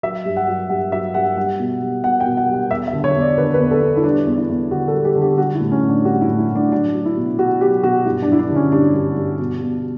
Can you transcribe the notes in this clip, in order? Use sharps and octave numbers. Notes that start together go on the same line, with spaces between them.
F#3 E5
G2
F#5
F#3
G2 F#5
F#3 E5
G2 F#5
G3 F#5
B2
G3
B2 F#5
G5
B2
F#5
G3
F#5
E2 E5
E5
D3
C#5
E2
D5
D3 B4
B4
E2
A4
E2
E4
G3 D4
E2
E4
E2
D3 F#4
A4
G3
G4
D3
G4
G3 F#4
E4
A2
C#4
A2
D4
G3 F#4
E4
A2
E4
A2
D4
F#3 D4
F#3
E4
B2
B2 F#4
F#3 G4
B2 F#4
G2 E4
D4
F#3 E4
D4
D3
C#4
G2 D4
G2
G2
B2
B2